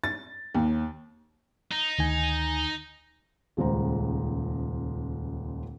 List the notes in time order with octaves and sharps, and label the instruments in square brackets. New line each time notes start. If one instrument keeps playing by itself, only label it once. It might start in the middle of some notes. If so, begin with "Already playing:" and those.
[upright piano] A6
D#2
[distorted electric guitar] D#4
[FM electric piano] D2 D#3 G#5
[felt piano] D#1 C#2 G#3 C5 A#5